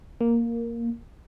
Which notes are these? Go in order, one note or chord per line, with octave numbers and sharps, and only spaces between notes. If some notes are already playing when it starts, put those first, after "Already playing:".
A#3